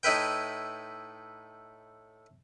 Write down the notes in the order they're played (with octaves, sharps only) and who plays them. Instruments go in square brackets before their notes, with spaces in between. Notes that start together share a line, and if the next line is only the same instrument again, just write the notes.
[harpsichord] A2 D#4 E4 B4 G5